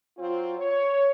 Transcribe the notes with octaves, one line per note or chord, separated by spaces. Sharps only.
F#3 C4 F4
C#5